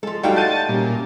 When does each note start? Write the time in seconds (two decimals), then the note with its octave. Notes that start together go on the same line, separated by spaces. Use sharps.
0.03 F3 G#3 A4
0.23 A2 G3 D#4 F#4 A4 F5 G5
0.36 A5 G6 D#7
0.69 A#2 G3 C#4